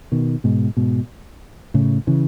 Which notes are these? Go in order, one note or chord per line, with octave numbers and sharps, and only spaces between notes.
B2 D#3
G#2 B2
G#2 B2
A2 C#3
C#3 E3